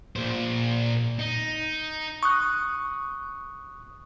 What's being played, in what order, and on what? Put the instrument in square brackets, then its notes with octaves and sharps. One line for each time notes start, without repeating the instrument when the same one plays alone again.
[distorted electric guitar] A#2 C5
D#4
[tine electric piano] C#6 D#6 F#6